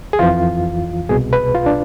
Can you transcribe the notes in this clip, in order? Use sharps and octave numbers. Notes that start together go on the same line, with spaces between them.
G#4
F2 E3 F4
C2 B2 G#4
B4
F4
D4